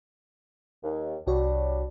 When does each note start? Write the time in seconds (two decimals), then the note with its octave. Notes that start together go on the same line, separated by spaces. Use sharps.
0.84 D#2
1.27 C2 G3 D4 F#4 C#5